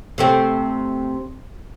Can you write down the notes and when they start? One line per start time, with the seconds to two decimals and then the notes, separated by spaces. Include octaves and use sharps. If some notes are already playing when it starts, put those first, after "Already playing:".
0.18 C3 A3 C4